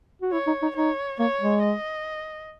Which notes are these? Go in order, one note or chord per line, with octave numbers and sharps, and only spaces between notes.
F#4
E4 C#5
D#4
D#4
D#4 C#5
A#3 C#5
G#3
D#5